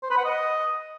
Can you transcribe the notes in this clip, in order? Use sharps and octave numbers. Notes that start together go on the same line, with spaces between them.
C5
B4
F#5
D#5